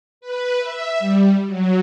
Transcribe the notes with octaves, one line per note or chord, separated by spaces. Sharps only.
B4
E5
G3
F#3